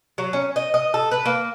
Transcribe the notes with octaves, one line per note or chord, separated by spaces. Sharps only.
F#3
C#4
D#5
D#5
A4
B4
A#3